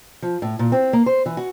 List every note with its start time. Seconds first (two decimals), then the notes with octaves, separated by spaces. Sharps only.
0.22 F3
0.42 A2
0.59 A#2
0.72 C4
0.93 A#3
1.06 C5
1.26 E3
1.37 F#4